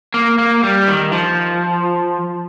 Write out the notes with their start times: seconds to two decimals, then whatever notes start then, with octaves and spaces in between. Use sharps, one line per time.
0.14 A#3
0.38 A#3
0.63 G3
0.88 D#3
1.13 F3